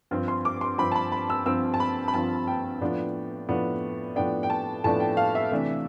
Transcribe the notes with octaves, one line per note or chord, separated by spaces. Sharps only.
G2 F3 C4
C6
D6
C6
G2 F3 C4 B5
A5
B5
B5
E6
G2 F3 C4 E6
A5
B5
B5
G2 F3 C4 A5
G5
A2 F3 B3 D4
A2 F3 B3 D4
A2 F3 B3 D4 G5
G5
A5
A2 F3 B3 D4 A5
G5
F5
E5
C3 E3 A3 D4